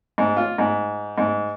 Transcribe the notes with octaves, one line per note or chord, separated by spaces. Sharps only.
G#2
F4
G#2
G#2